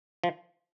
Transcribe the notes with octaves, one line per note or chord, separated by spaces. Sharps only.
F3